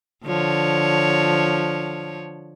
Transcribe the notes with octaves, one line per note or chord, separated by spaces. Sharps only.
D3 F3 C#5